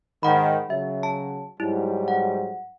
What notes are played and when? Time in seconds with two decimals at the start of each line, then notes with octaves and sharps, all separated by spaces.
0.23 G#2 D#3 F#5 B5
0.70 C#3 F#3 E5
1.03 A5
1.60 G#2 F#3 G3 E4
2.08 F#5